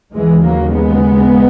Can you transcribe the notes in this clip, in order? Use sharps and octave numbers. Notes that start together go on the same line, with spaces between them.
D#2 C#3 E3 G#3
F#3 A#3
G#3 B3